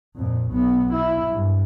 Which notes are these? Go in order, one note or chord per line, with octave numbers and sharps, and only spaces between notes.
F2 A#2
B1 B3
E4
G2